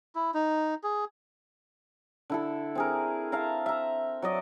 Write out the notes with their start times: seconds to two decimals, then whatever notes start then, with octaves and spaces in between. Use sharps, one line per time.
0.15 E4
0.34 D#4
0.83 G#4
2.30 D3 E4 A4
2.75 C4 G#4 A#4
3.32 E5 F5 A5 A#5
3.66 E5 A#5
4.22 F#3 D5 D#5